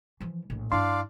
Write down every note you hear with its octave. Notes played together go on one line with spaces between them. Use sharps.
E3 F3
A#1 A2
G2 D4 E4 D5 F5 C6